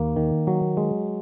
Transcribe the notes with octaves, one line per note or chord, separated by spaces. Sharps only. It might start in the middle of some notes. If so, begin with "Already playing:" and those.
Already playing: D#2 A#3
D#3
F#3
G#3